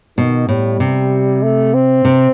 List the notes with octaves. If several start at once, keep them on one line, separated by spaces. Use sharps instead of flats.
B2 D#3
A2 G3
C3
A3
C4
C3